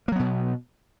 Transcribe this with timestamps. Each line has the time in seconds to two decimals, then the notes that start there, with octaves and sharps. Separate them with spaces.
0.08 A#3
0.12 F#3
0.16 B3
0.19 B2